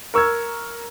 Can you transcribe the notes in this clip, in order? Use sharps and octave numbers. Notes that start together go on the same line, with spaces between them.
A#4 C#6 E6 F6 G#6